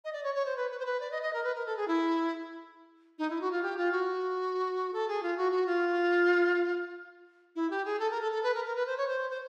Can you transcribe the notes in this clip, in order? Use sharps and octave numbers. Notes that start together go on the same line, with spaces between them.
D#5
D5
C#5
C#5
C5
B4
B4
C5
B4
D5
D#5
D#5
A#4
B4
A#4
A4
G#4
E4
D#4
E4
F#4
F4
G4
F4
F#4
A4
G#4
F4
F#4
F#4
F4
E4
G4
G#4
A4
A#4
A4
A4
B4
A#4
A#4
B4
C5
C#5
C5
C5